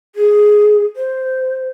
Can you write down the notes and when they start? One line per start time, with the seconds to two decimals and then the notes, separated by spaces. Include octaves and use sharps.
0.15 G#4
0.96 C5